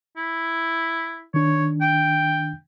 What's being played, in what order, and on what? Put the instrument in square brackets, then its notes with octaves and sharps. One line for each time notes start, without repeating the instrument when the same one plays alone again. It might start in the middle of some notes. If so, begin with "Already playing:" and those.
[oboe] E4
[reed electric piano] D#3 D4 [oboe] C#5
[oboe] G5